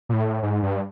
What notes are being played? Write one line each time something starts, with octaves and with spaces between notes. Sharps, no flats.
A#2
A2
G#2
G2